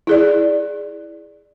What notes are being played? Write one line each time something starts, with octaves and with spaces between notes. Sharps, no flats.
E4 G#4 D5